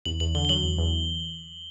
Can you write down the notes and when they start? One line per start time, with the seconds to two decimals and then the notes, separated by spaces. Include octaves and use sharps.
0.05 E2 F#7
0.20 E2 F#7
0.35 D3 G7
0.45 G7
0.49 F#3 F#7
0.63 E2
0.78 E2